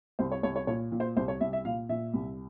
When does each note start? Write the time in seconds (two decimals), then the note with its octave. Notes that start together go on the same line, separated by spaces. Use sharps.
0.19 C2 C5
0.32 C#5
0.43 C2 C#5
0.56 C#5
0.67 A#2 C#5
0.92 A#2
1.00 C5
1.16 C2 C5
1.28 C#5
1.40 C2 E5
1.53 E5
1.65 A#2 F5
1.89 A#2 E5
2.13 C2